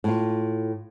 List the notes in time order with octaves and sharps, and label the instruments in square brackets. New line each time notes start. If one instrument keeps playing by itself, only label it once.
[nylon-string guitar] A2 F4